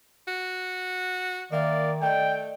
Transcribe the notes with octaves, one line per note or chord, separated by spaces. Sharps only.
F#4
D#3 A#3 D5 E5
A3 D5 D#5 G5